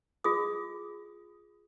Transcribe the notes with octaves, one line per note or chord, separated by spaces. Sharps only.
F4 G#4 D#6